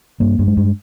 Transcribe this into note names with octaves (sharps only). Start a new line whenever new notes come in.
G2 A#3
G2
G#3
G2